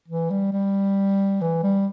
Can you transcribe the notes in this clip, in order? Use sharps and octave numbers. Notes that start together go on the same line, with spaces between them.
E3
G3
G3
E3
G3